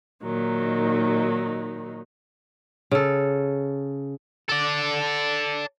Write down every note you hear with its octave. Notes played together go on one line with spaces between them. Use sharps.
A#2 D#3 F#3 D#4
C#3 A4
A4 D5